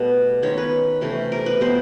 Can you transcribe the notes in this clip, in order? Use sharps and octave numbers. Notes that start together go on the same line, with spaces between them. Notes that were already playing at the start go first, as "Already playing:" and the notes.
Already playing: B2 G3 A3 B3
D#3 G#3 C#4 C#5
B4
C3 E3 A3 C#4
A#4
B4
B2 G3 C4 C5